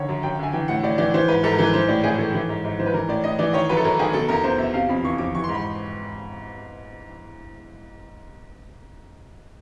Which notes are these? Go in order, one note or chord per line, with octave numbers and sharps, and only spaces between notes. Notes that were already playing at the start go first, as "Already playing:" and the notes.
Already playing: D3 D#3 C#5
F#2
F#2 G5
D3 G#5
E3 G5
A2 F#5
A2 D5
E3 D5
E3 C5
G#2 B4
G#2 A4
A#4
E3 B4
E3 C5
A2 D5
A2 G#4
E3 A4
E3
G#2
G#2
E3 C5
B4
E3 A#4
A2 D5
A2 D#5
E3 D5
D#3 C#5
F#2 B4
A4
F#2 A#4
D#3 G#4
B2 A4
E2 A#4
E2 C5
B2 E5
C3 F5
F2 B5
E3 C#6
F2 D6
E3 C#6
C6
G#2
B5